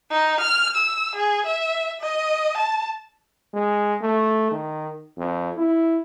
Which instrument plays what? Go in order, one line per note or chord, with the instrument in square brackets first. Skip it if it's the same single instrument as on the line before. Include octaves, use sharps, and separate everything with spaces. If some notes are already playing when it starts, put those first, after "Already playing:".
[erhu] D#4
F6
E6
G#4
E5
D#5
A5
[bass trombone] G#3
A3
D#3
F2
E4